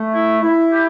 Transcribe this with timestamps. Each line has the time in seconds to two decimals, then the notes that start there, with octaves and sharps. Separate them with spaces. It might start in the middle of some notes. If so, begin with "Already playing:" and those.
Already playing: A3
0.13 E4
0.42 E4
0.72 G4